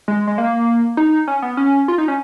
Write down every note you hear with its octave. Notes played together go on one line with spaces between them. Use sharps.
G#3
G#3
A#3
D#4
C#4
B3
C#4
F4
D#4
C#4